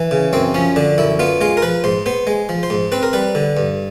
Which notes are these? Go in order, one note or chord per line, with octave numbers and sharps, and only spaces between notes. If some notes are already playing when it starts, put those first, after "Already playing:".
Already playing: E3
C#3
F#2 C4
F3 C#4
D3 D4
F#2 E4
B3 F4
G#3 F4
A#4
F3 B4
G#2 C5
B3 C5
G#3
F3
C5
G#2
C4 B4
A#4
G3 B4
D3
G2